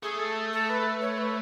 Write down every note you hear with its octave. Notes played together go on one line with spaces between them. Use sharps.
A3 G#4
A4
A4
B4
C#5
B4